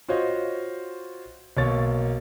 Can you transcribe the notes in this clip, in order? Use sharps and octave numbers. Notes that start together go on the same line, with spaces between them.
F4 F#4 C5 C#5 D#5
B1 A#3 C#5 C#6 A6